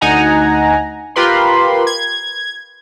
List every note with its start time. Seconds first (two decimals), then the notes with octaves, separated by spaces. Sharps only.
0.01 D2 D#4 F#5 G#5 A#5
1.16 F4 G4 A#4 B4 B5 C6
1.87 G#6